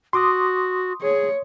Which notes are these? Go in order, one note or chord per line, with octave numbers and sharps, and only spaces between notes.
F#4 C6 D6 D#6
G#4 C#5